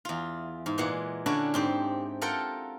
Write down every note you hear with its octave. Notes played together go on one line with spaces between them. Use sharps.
E2 F4
G#2
A#2 E3 G#3 F#5
D3 C#4 D4 E4 F#4
G#2 C4 G4
F4 A4 A#4 F#5 G5